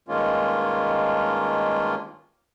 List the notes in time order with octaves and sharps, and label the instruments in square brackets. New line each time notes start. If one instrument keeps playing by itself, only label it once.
[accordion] G2 D#3 G#3 A#3 C#4 F4